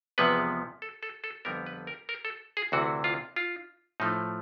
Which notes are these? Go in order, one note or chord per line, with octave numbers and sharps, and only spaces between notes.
E2 C3 F3 G#3 B3 B4
A4
A4
A4
F2 D3 G3 B3 A#4
B4
A#4
A#4
A4
G#4
D2 C3 E3 F#4
F4
F4
A2 F3 A3 D#4